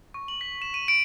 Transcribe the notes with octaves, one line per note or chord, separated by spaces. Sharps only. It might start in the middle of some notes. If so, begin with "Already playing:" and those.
C#6
F#7
B6
E7
D#7
D7